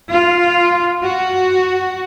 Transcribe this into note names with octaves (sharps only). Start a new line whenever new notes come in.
F4
F#4